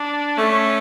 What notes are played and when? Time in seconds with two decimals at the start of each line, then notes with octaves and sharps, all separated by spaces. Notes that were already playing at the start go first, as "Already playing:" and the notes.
Already playing: D4
0.38 A3 C#4